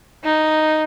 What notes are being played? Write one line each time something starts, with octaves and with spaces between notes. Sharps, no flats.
D#4